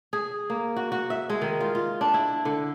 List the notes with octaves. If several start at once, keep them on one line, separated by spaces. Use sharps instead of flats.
G#4
A#3
F#4
F#4
E5
G#3
D#3
F4
F4
D4
E4
D3